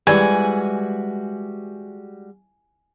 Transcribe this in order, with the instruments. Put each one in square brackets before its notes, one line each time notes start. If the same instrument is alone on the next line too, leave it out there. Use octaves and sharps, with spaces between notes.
[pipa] E3 [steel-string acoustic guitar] G3 G#3 F#4 [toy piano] E4 G4 D5 [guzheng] G#5